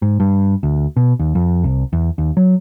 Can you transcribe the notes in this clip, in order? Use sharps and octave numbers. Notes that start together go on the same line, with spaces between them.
G#2
G2
D2
B2
D#2
F2
C2
E2
D#2
F#3